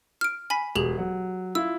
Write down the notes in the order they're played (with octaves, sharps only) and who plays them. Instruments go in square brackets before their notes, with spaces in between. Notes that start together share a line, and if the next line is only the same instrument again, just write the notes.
[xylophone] F6 D7
G#5 B5 B6
[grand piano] E1 [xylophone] G4 G#4 F#7
[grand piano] F#3
[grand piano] E4 F4 [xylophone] E6